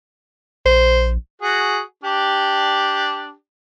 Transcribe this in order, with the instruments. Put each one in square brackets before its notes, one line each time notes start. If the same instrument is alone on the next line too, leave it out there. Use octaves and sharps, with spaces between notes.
[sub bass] A#1 [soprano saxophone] C5
[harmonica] F#4 G#4
D4 G4